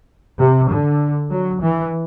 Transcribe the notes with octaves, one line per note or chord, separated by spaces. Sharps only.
C3
D3
F#3
E3